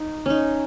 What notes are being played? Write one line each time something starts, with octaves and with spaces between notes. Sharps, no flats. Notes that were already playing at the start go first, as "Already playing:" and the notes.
Already playing: D#4
C#4 D#4